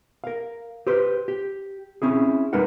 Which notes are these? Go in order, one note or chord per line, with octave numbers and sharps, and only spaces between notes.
A#4 F5
G4 B4 C5
G4
C4 C#4 E4 G#4
G3 G#3 D#4 A#4 B4 F#5